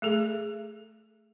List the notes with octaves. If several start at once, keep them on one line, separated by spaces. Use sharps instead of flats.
A3 G#4 A4